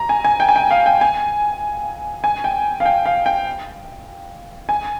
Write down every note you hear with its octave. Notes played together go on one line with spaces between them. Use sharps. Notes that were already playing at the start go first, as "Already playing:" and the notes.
Already playing: A#5
G#5
G#5
G5
G#5
G5
F5
G5
G#5
G#5
G5
F5
G5
F5
G5
G#5